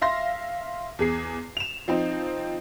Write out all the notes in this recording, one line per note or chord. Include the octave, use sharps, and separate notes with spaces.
E5 F5 C6 A#6
E2 G#4 C7
E7 F7
F3 C4 D#4